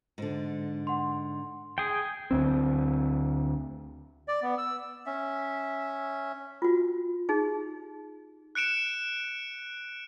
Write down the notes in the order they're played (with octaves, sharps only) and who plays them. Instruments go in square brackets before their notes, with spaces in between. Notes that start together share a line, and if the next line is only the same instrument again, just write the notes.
[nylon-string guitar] G#2 D3
[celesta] F#5 C6
[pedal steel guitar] G#4 G5
[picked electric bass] D2 C4
[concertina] D5
B3
E6
[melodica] C#4 E5
[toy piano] F4 F#4
D#4 G4 G#4
[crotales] F#6 C#7 D7 E7